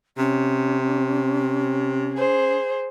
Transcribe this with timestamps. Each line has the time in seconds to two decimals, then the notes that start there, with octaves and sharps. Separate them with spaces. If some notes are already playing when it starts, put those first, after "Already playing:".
0.18 C3 C#4
2.13 G#4 C5